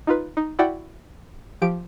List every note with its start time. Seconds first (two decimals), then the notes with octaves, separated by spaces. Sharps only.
0.07 D#4 F4 B4
0.37 D#4
0.59 E4 F#4 D5 F#5 G5
1.62 F3 G4 D7